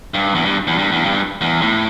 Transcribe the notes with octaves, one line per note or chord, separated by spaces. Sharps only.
G2
E2
G2
E2
G2
E2
G2
E2
A2